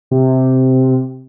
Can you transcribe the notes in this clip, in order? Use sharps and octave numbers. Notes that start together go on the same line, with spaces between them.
C3